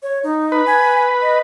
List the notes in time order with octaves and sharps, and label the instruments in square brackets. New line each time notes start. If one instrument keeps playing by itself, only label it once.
[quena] C#5
D#4
[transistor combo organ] B4
[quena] G#5
D#5